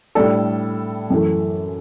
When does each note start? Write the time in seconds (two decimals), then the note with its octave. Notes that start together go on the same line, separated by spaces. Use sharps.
0.15 A2 G3 D4 A4
1.10 F#2 E3 A3